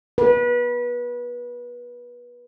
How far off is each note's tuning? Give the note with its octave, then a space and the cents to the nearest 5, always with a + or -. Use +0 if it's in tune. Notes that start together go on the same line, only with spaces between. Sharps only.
B4 -25